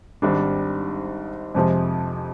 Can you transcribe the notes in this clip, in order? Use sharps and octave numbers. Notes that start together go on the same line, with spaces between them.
G#1 G#2 G3 D4
F2 C3 F3 G#3